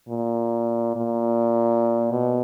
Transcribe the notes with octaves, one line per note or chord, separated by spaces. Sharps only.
A#2
A#2
B2